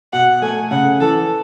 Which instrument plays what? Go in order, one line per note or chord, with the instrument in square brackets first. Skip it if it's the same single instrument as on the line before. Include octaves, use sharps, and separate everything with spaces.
[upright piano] B2 [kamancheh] F#5
[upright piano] A3 [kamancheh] G#5
[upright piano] C#3 [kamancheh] F#5
[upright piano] E3 [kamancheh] A4